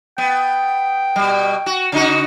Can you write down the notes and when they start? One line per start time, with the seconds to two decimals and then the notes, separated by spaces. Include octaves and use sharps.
0.18 B3 G5
1.16 B2 G3
1.66 F#4
1.92 C#3 D#4 F#4